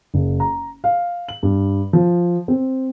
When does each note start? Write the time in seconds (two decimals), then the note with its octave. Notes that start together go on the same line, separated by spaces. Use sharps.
0.14 F#1
0.40 A#5
0.84 F5
1.29 F#7
1.43 G2
1.93 F3
2.48 C4